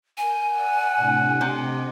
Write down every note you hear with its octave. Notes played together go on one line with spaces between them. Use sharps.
A#4 G#5 G6
D5 F#5 E6
A2 C3 D4
C3 G4 D#5 G5